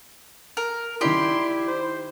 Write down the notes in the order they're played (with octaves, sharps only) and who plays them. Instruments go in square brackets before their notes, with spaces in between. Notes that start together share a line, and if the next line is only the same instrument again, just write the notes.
[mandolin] A#4
[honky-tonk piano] D#3 D7 [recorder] E4 [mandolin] G4 D5 [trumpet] C6
[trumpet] C5